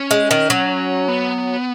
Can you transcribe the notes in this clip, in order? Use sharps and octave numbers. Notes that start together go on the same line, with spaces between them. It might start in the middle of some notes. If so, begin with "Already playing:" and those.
Already playing: C#4
G#3
D#3
F#3
B3